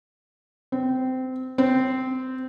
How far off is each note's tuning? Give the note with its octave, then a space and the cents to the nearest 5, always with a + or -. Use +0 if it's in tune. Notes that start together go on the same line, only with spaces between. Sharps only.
C4 -20
C4 -15